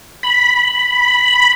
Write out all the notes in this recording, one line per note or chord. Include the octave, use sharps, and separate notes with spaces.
B5